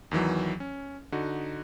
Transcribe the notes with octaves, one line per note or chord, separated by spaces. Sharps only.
E2 D#3 E3 F#3
C#4
D3 D#4 F#4